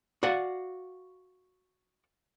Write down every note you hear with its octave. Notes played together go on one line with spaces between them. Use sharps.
F#4 D5 F5 F#5